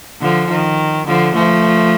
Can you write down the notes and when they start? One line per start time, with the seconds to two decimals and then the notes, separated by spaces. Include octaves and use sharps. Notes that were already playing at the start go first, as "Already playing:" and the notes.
0.21 D3 F3
0.50 D#3
1.07 D3 F3
1.35 F3 A3